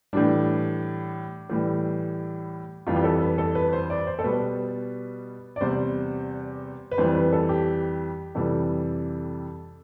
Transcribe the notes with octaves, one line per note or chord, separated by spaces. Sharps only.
A2 E3 G3 D4
A2 E3 G3
F2 E3 G3 F4
G4
A4
B4
A4
B4
C5
D5
C5
A4
B2 G3 B4
D5
E2 C3 G3 C5
B4
F2 E3 G3 C5
B4
A4
G4
F2 C3 E3 G3 A4